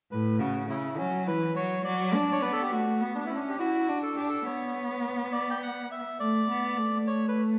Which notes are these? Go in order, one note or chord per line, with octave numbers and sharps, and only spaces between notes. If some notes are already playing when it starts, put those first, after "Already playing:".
A2 B4
C#3 F#4
C#3 E4
F#3 C#4
E3 B4
F#3 C#5
F#3 D5
D4
C#5
B3 B4
A4
G4
A3 F#4
B3
D4
C#4 E4
D4
G4
E4 F#4
D4
A4
D4 G4
A4
B3 C#5
D5
G5
F#5
E5
A3 D5
B3
A3
C#5
B4